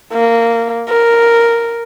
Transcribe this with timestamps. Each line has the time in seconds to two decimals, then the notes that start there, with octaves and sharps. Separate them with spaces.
0.13 A#3
0.89 A#4